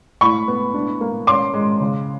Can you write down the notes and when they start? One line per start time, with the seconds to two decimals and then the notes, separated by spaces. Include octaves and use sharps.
0.21 A2 B5 C#6
0.48 B3
0.74 D4
1.01 A#3
1.27 C#4 C6 D6
1.54 G#3
1.80 C#3